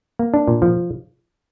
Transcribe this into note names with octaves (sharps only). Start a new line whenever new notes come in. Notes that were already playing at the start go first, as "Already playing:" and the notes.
A#3
D4
A#2
F3